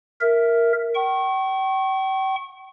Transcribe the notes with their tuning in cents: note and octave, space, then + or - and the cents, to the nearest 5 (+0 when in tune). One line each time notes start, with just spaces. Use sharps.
A#4 +0 E5 +0
G5 -40 C#6 -25